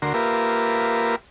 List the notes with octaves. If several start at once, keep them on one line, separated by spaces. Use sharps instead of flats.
D2 D3 F#4 A#4 C6
A#3 F4 G4 A#4 B4 E5